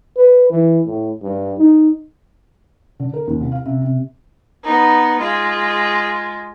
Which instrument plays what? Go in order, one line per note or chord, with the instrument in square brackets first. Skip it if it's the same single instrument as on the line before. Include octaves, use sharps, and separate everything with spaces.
[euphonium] B4
E3
A2
G2
D#4
[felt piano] D3
A#4
D#2
C2
F5
C3
C3
[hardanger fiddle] B3 D#4
G#3 F4